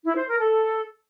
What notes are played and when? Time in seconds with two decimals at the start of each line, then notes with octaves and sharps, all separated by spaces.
0.04 E4
0.16 C5
0.27 A#4
0.39 A4